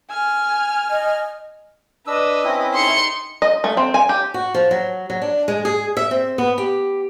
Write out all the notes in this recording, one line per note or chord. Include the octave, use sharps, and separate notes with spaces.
G#5 F6
D#5
D4 B4 D#5 E6
C4 C#4 E4
D#4 C6 C#7
D#5
A3
C4
G#5
G4
F#4
F3
F#3
F#3
D4
G#3
G#4
E5
C4
B3
G4